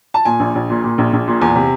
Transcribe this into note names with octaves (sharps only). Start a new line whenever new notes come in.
A5
A#2 G#5
A#1
A#1
A#2
A#2
A#1
A#1
A#2
E2 G#5
C3